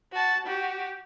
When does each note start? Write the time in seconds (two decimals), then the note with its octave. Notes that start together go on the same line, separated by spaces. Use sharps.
0.12 F#4 A5
0.46 F#4 G4